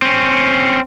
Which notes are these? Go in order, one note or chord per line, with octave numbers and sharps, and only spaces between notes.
C4 C#4